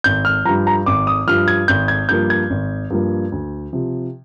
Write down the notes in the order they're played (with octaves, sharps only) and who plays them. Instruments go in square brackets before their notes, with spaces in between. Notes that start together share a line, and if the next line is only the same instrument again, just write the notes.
[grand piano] G#1 G6
F6
F3 A#5
G2
A#5
G#1 D6
D#6
G2 F3 F6
G#6
G#1 G6
G#6
G2 F3 A#3 G6
G#6
G#1
G2 F3 A#3
D2
C3 F3